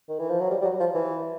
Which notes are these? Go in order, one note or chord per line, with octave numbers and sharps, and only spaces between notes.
D#3
E3
F3
F#3
G3
G3
F#3
F3
E3